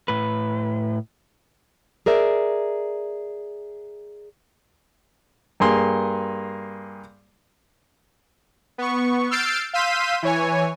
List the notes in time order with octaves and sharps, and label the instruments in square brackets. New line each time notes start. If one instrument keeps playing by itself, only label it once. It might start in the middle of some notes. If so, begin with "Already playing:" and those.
[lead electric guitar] A2 B4
[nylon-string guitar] G#4 A#4 D5 E5
[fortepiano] G2 A#3 G#4 C6
[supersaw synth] B3 C#6
E6 F6 G6 A6 C7 D7
F5 C6 E6 G6 B6 D#7
E3 C#5 G#5